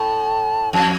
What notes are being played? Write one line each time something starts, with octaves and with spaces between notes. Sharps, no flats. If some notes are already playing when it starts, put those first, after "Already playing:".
Already playing: A2 A5
F2 A5